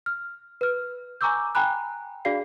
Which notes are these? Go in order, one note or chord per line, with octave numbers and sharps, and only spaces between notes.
F6
B4 F6
G#5 A#5 C#6 D6 E6 G6
G5 G#5 A#5 B5 F#6
D4 F#4 G#4 D5 F5 C7